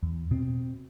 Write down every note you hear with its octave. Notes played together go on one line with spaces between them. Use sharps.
E2
B2 C4